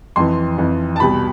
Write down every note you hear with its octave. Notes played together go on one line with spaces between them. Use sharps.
F2 E3 C6
F2 E3
A5
C2 B2 B5